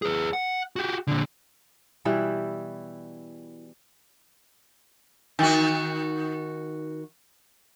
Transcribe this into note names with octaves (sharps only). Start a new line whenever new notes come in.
G#4 B4
F#5
F#4 G4
A#2 D3
B2 E3 G3 E4
D#3 F#4